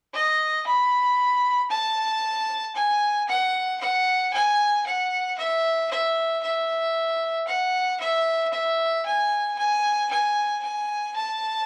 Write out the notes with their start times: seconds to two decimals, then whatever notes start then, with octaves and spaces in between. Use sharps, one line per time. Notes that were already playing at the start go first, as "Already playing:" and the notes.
0.14 D#5
0.66 B5
1.70 A5
2.75 G#5
3.28 F#5
3.81 F#5
4.33 G#5
4.86 F#5
5.38 E5
5.90 E5
6.43 E5
7.47 F#5
8.00 E5
8.53 E5
9.05 G#5
9.58 G#5
10.11 G#5
10.62 G#5
11.16 A5